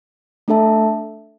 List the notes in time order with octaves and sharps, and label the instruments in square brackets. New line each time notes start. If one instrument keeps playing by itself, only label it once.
[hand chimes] A3 D4 A4 E5 A5